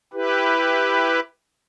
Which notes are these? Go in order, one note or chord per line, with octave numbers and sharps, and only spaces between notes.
E4 G4 B4